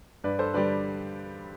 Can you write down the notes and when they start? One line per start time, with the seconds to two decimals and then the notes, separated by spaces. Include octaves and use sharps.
0.24 G2 B4 D5
0.39 A4 C5
0.54 D3 G3 B4 D5